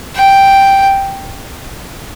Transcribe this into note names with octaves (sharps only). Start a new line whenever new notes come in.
G5